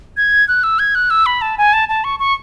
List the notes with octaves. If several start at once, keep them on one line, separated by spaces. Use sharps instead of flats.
G#6
F#6
E6
G#6
F#6
E6
B5
A5
G#5
A5
A5
C#6
C#6